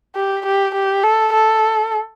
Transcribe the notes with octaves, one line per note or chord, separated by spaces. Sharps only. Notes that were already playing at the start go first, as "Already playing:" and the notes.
G4
G4
G4
A4
A4